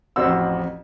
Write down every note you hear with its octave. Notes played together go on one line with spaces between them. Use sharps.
A1 F2 C4 F#4 F#5 E6